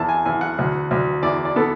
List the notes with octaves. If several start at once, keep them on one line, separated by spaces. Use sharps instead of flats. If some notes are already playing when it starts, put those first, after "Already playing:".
Already playing: E2 A5
G#5
E2 G#5
F#5
D2
D2
E2 D5
D5
B3 A4